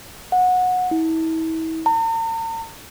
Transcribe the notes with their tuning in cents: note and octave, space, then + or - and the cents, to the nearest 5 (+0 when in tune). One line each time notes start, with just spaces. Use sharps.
F#5 -20
E4 -35
A#5 -45